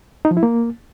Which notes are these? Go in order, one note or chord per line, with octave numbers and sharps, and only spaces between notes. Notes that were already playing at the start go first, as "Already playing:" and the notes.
D#4
F3
E4
A#3